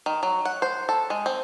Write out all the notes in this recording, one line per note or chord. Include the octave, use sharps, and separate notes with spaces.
D#3
F#3
F#5
C5
A4
G#3
C4